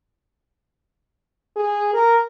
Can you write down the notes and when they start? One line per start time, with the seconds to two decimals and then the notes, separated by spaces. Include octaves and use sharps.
1.56 G#4
1.94 A#4